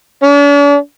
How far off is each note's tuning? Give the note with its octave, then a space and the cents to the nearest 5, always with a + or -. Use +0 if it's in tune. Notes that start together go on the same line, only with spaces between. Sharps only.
D4 -45